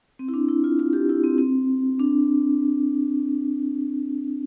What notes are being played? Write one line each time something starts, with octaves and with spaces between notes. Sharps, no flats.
C4
E4
D4
E4
F4
F4
G4
E4
C4
C4
D4